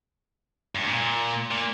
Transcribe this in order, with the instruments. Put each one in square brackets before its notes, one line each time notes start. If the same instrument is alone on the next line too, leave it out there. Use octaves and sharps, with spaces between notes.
[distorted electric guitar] G2
A#2
A#2